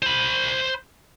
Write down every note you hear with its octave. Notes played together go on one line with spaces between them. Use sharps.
C5 B5